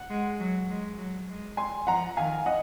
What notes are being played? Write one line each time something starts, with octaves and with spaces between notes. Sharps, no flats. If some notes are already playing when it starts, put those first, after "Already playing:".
Already playing: F#5
G#3
F#3
G#3
F#3
G#3
G#5 C6
F3 F#5 A#5
D#3 F5 G#5
D#5 F#5